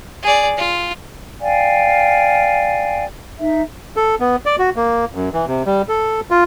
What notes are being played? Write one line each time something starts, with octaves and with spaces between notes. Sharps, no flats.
G#4 D5
F4
D5 F5 G5 G#5
D#4 E5
A4
B3
D5
F#4
A#3
F#2
E3
C3
G3
A4
F4